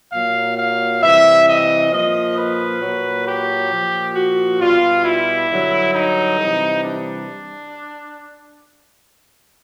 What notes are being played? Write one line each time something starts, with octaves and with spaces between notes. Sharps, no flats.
A#2 F#3 F5
F5
C3 E3 G3 E5
D#5
A#2 F3 D#5
B4
A#2 F#3
G4
A#2 F3
F#4
B2 G3 F4
E4
G2 D3 F#3
D#4
C3 E3 G3
D4